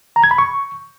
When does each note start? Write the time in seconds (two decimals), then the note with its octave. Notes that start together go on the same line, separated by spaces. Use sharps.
0.16 A#5
0.24 G#6
0.31 B5
0.38 C#6